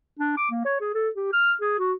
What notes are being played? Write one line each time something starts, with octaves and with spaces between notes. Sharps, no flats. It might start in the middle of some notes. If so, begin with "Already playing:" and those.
D4
D6
A#3
C#5
G#4
A4
G4
F6
G#4
F#4